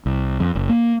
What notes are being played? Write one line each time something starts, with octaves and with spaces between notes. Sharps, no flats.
C2
F2
F#1
A#3